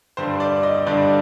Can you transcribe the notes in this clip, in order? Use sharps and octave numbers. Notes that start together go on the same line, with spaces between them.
G2 D3 G3 C5
D5
D#5
G2 D3 G3 D5